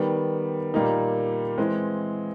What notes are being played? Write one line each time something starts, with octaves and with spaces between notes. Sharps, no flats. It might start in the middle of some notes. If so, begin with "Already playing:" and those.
Already playing: D#3 G3 B3
A#2 G3 A#3 D#4
E3 G#3 C4